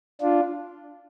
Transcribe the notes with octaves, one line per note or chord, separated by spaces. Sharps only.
D4 F4